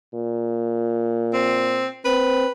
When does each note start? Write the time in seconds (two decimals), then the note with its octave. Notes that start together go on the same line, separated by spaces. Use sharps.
0.14 A#2
1.33 C4
2.05 C4 B4